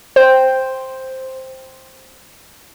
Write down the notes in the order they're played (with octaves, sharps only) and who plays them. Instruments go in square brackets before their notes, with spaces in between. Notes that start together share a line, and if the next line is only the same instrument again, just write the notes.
[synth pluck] C5 G5